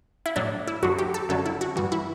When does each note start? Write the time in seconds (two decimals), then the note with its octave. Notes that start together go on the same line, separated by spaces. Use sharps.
0.26 E4
0.36 A2 F#3 D4
0.68 E4
0.83 F#2 D3 F#3 F#4
0.98 G4
1.14 A4
1.29 F#2 D3 F#3 A4
1.46 E4
1.61 F#4
1.76 G2 E3 F#4
1.92 E4